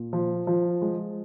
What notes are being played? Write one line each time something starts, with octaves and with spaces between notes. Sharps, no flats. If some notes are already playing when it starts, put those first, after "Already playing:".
Already playing: A#2
F3
F3
G#3